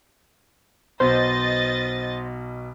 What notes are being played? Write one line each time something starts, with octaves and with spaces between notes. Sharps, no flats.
B1 B2 C5 D#5 A6